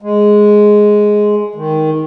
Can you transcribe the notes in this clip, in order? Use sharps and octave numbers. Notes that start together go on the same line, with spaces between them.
G#3
D#3